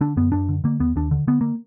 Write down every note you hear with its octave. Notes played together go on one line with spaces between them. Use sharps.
D3 D4
F#2 B3
F#2 D4
D3
D3 A#3
D#2 B3
D#2 D4
D3
D3 B3
A#3